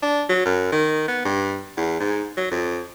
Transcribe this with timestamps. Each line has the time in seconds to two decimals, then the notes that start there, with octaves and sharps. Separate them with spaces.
0.03 D4
0.29 F#3
0.45 F#2
0.72 D#3
1.08 B3
1.25 G2
1.77 E2
2.00 G#2
2.37 F#3
2.51 F2